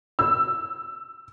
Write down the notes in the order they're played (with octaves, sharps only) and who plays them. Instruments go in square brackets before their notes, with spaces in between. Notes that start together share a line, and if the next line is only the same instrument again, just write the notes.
[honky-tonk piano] E6